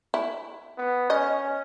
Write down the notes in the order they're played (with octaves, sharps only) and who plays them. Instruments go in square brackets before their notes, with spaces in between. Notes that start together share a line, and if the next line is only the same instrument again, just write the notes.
[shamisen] E4
[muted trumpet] B3
[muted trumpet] C#4 [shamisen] D#5